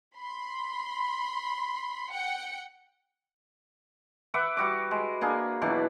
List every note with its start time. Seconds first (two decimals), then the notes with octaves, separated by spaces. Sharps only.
0.16 B5 C6
2.11 F#5 G5 C#7
4.34 B4 E5 F#5 D6
4.57 G3 F#4 D6
4.91 G#3
5.21 A#3 D4 G#4
5.62 B2 E3 F#3 D4